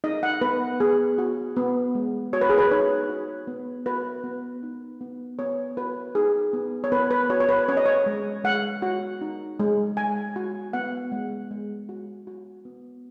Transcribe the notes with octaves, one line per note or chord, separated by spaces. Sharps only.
D#4 D#5
F#5
B3 B4
B3 G#4
F#4
B3
G#3
F#4 C#5
B4
G#4
B4
D#4 C#5
F#4
B3
F#4 B4
B3
D#4
B3
B3 C#5
F#4 B4
D#4 G#4
B3
C#5
B3 B4
B4
F#4 C#5
C#5
B4
C#4 C#5
D#5
C#5
G#3
G#3 F#5
F#4
D#4
G#3
G#3 G#5
F#4
B3 F#5
G#3
G#3
F#4
F#4
B3